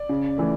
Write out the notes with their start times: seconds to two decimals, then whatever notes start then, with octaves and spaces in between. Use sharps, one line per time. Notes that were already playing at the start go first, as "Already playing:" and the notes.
Already playing: D5
0.09 C#3
0.38 E3 A3